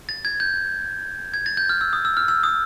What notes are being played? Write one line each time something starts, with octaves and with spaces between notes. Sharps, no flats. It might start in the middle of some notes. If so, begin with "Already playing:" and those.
A6
G#6
G6
G#6
A6
G6
F6
E6
D#6
E6
F6
E6
D#6